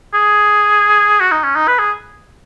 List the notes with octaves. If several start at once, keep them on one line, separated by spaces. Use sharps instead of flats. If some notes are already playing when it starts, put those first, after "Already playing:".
G#4
F#4
D#4
C#4
D#4
B4
G#4